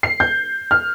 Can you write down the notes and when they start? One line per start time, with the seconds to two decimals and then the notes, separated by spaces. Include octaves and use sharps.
0.03 C7
0.20 G6
0.71 F6